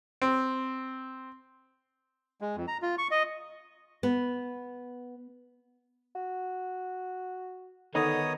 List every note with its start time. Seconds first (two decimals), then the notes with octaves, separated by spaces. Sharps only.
0.22 C4
2.41 G#3
2.56 F2
2.68 A#5
2.82 F4
2.98 C#6
3.11 D#5
4.03 B3
6.15 F#4
7.95 D3 D#3 B3 D#4 C#5 D#5 D#6